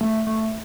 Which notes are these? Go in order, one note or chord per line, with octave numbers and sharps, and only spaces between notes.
A3
A3